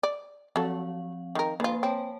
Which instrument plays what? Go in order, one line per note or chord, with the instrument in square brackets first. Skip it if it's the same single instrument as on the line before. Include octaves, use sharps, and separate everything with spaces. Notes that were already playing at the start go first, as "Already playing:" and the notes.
[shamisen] D5
[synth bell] F3 C4 F5 [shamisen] F#3 A4
[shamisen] D#3 A#4
[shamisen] D3 F4 [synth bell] A#3 B4 G#5
[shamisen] C4 [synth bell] C#5 A5